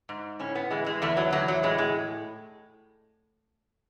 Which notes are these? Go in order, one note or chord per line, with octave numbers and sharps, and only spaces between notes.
G#2
A2 C#4
B3
E3 G#3
G#3
E2 A3
F#3
E2 F#3
F#3
A2 G#3
G#3